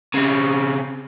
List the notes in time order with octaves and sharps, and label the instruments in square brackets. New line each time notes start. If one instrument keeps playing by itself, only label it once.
[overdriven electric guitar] C#3 C4